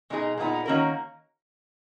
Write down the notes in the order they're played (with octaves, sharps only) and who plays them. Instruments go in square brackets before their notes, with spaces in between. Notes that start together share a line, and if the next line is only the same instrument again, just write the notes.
[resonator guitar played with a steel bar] B2 G#3 D#4 G#4
A#2 G#3 B3 D#4
D#3 A#3 C#4 F#4 A#4